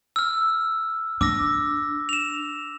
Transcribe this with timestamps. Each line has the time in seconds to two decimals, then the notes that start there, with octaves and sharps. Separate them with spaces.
0.16 E6 F6
1.21 D4 D6 E6 A#6
2.09 E7 F7